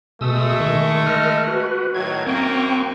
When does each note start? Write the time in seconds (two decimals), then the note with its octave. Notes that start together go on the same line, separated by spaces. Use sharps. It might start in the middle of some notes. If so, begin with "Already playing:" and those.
0.21 B2 G#3 A3 D#6 E6
0.60 D#3 C#6
1.06 A#4 D#5 F6
1.47 F#4 B4
1.95 A2 D#3 F#3 G#6
2.26 F#2 A#3 C4 G5 C#6